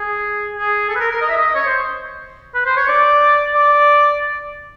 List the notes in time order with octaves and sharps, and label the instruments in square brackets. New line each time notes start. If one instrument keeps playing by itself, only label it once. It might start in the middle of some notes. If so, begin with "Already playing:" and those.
Already playing: [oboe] G#4
G#4
A4
B4
A#4
A#4
D#5
E5
D#5
C#5
C5
B4
C5
C#5
D5
D5